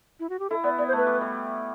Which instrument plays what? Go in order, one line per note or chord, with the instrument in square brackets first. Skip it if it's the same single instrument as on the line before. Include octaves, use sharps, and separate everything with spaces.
[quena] E4
F#4
G4
[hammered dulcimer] E4 [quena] A4
[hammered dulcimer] B3 [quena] D5
[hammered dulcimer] B3 [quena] D5
[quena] C5
[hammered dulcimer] A3 [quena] B4
[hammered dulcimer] G3
G3